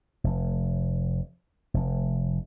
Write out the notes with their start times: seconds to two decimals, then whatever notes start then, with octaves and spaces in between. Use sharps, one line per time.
0.24 F1
1.74 F1